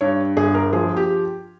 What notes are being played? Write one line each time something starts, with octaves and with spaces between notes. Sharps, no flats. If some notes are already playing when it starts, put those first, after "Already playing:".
G2 C#5
G1 G#4
A#4
F3 G#4
G4